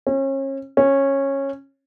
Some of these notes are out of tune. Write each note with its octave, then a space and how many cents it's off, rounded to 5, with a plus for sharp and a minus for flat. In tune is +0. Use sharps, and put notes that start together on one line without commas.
C#4 -35
C#4 -15